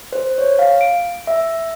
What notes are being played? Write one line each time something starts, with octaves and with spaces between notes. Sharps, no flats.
C5
C#5
F5
D7
E5